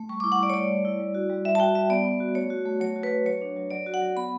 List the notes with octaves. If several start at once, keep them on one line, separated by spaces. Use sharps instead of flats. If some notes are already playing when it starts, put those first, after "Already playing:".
Already playing: A3
G3 C#6
E4 D6
F#5
G3 D5
C#5
A3 D5
A3
E4
G3
F#4
G3
G3 E5
A5
F#4 G5
G3 E5
B3 D5
B3
F#4
A3 C#5
F#4
A3
F#3 C#5
F#4
B4
F#3
F#3 C#5
D4
F#3
F#3 D5
F#4
F#5
F#3
B3 B5